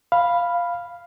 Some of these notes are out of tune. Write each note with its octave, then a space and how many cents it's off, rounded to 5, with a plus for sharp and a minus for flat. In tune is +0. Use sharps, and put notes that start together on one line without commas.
F5 +0 B5 +0